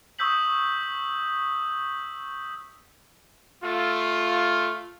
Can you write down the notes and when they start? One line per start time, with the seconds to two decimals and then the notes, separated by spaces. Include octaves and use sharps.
0.19 C#6 D#6 E6 G6 B6 F#7
3.63 A3 F4